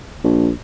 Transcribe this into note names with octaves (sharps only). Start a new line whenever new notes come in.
A#1